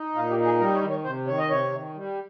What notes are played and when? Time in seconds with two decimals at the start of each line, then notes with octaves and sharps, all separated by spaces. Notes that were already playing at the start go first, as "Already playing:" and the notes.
Already playing: D#4
0.15 A#2 F4
0.30 G4
0.37 D#4
0.45 G#4
0.59 G3 A#4
0.74 C#5
0.82 D#3
0.90 C#5
1.04 C3 C5
1.27 D#3 C#5
1.38 D#5
1.49 C3 C#5
1.72 D#3
1.94 G3